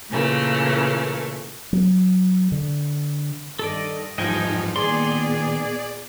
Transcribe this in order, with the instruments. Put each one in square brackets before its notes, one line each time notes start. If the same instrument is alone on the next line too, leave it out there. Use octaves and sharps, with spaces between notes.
[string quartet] A#2 C#3 E3 A3 A#3
[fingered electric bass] F#3
D3
[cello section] G2 D#3 D#5 [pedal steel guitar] A4 D5
[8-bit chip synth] G#2 F3 [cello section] E3 G3 D#4 [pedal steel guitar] D#5 G5 G#5
[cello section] A#2 B3 [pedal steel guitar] D#3 C6 [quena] G#4 [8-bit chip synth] D5